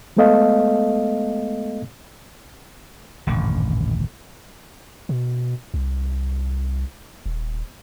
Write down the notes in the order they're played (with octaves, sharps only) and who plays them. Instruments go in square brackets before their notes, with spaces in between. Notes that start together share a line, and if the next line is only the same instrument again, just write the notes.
[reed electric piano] G#3 A3 B3 A4 D#5 F5
[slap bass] D#1 A1 F#2 D3
[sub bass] B2
C2
D#1